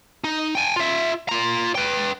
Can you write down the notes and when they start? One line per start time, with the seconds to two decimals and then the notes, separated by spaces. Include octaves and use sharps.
0.24 D#4
0.55 G5 G#5
0.76 F4 E5
1.29 F4 A#5
1.75 B4 G5